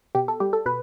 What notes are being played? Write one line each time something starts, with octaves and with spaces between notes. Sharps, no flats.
B2 G4
A4
G3 G4
A4
B2 B4